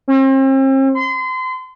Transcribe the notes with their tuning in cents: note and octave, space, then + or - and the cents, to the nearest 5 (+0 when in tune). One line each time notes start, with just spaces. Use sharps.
C4 +40
C6 -35